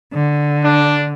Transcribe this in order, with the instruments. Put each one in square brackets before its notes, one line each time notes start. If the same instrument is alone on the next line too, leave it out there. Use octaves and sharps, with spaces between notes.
[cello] D3
[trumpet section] D4